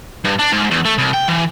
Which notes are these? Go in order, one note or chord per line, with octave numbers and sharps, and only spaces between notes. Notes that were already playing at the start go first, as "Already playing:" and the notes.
G2
D4
G#2
E2
A3
C2
G5
E3